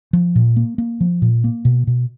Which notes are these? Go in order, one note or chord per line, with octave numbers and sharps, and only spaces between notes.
F3
A#2
A#3
A#3
F3
A#2
A#3
B2
B2